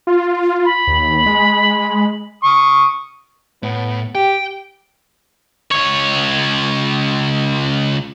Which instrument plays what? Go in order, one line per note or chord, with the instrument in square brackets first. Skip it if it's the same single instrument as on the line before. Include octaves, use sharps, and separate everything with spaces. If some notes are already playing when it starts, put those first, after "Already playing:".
[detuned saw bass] F4
[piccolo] B5
[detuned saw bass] D#2
G#3
[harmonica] C#6 D#6
[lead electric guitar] A2 [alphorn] B3
[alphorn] G4 [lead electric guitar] G5
[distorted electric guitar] C#2 C#5